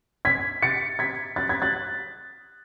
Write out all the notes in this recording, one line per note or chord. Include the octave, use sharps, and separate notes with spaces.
G#6 B6
A6 C#7
G#6 B6
F#6 A6
G#6 B6
F#6 A6